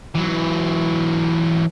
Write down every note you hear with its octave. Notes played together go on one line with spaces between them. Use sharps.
E3 F#3